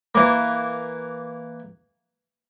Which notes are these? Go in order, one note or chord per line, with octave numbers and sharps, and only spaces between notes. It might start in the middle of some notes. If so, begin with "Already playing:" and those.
E3 A#3